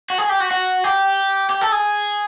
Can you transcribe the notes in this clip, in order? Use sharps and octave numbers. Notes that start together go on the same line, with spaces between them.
F#4
G#4
G4
F#4
F#4
G4
G4
A4
G#4